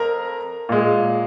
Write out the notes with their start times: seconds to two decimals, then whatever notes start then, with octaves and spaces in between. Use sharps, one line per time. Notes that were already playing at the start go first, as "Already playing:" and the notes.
Already playing: F2 A#4 A#5
0.69 A#2 G#3